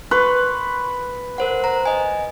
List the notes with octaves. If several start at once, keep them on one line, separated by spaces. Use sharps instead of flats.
B4 C6 C#6
A#4 C5 F#5
C5 A#5
D#5 G#5